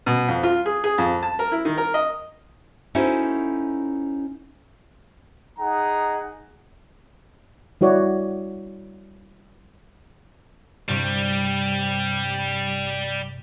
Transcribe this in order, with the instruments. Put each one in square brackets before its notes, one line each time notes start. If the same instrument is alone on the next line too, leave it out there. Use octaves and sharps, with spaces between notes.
[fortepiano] B2
F2
F4
G#4
G#4
F2
A5
A#4
E4
D#3
A#4
D#5
[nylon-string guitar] C#4 D#4 E4 F#4 A4 C5
[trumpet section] D#4 G#4 F#5 A#5
[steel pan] G3 E4 F#4 C#5 D5
[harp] G2 C3 [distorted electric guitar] G3